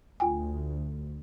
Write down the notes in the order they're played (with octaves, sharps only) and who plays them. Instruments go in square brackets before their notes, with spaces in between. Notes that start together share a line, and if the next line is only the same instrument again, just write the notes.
[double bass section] D2 [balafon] F4 G5 G#5